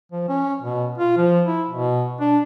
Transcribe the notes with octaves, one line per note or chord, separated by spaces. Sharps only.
F3
C#4
B2
F4
F3
E4
B2
D4